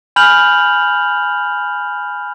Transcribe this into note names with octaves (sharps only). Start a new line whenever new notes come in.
G#5 B5 F6 G6 F7 F#7